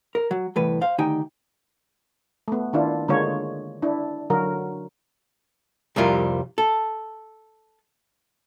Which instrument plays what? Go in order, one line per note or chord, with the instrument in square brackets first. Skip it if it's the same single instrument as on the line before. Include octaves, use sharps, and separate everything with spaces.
[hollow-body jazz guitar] A#4
F#3
C2 A2 E3 B4
C5 F5
D2 D#3 D#4 G4 G5 G#5
[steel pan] A3 B3
D#3 D4 E4 F4
D3 G#3 A#3 F4 C#5
D4 E4
D3 F#3 F#4 A#4
[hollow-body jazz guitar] C2 F2 G3 E4 F4 A#4
A4